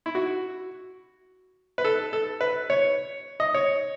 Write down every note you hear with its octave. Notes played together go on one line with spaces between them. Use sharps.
E4
F#4
B4
A4
A4
B4
C#5
D#5
C#5